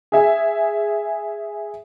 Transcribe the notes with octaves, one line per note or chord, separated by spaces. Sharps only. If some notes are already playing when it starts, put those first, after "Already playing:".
G#4 E5 G#5